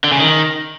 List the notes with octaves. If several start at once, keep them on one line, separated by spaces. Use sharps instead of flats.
D3
C#3
D#3